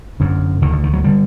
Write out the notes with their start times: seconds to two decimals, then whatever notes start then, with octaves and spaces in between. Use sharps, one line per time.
0.20 F#2 D3
0.62 D2 D3 D#3
0.72 D3
0.84 D#3
0.93 F#3
1.04 D3 G3